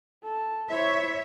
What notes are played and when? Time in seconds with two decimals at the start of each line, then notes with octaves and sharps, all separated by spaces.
0.23 A4
0.70 E4 C5 C#5 E5